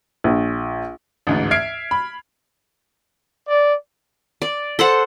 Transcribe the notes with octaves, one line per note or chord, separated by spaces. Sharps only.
A#1
A1 D2 G#2
E5 F6 G#6 C7 D7
B5
D5
D5
A4 C5 F#5